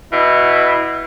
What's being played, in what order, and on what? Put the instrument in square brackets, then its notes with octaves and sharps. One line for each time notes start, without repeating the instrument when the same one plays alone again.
[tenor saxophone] B2 [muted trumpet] E4